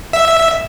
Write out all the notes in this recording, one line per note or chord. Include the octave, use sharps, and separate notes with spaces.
E5